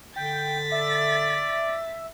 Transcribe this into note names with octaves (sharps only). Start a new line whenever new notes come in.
D3 G5 A6 B6
D5 E5